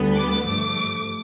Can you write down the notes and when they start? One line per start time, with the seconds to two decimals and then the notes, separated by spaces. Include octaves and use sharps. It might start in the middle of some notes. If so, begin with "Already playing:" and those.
Already playing: D2 D3 G3 B3
0.16 D6
0.45 G2 F3 A3